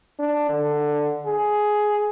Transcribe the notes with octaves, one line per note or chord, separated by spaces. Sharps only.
D4
D3
G#4